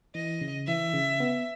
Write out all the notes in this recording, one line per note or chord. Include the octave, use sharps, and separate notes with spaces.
E3 D#5
C#3
E3 E5
C#3
B3